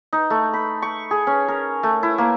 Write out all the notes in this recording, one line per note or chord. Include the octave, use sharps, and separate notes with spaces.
D#4
A3
B5
C#6
G#4
C#4
A#4
A3
E4
A#3